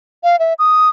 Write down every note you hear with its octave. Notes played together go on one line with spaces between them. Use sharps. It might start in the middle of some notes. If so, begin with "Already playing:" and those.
F5
E5
D#6